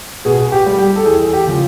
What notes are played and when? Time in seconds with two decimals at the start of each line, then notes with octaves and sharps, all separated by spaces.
0.25 B2 G#4
0.52 G4
0.66 G3
0.79 G4
0.96 A4
1.06 E2 G#4
1.33 G4
1.47 C#3 F3